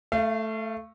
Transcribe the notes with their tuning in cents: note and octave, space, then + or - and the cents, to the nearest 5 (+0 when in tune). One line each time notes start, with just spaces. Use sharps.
A3 +0 F5 -35